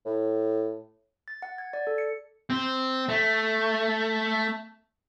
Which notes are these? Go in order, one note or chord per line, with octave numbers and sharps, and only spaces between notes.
A2
A6
F#5
G#6
D5
A4
C#7
C4
A3